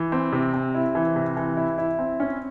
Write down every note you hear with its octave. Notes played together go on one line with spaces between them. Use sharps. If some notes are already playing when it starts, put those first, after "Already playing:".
Already playing: E3
C4
C3
C4
E4
E3
C3
E3
E4
E4
C4
C#4